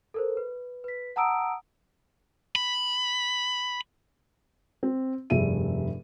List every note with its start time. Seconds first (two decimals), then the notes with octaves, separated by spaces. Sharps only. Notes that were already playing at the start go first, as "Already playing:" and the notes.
0.14 A4 A#4 C5
0.37 B4
0.84 B4 B6
1.16 F#5 A5 A#5 D#6 E6 D7
2.56 B5
4.83 C4
5.30 F1 G2 G#4 E5 D#7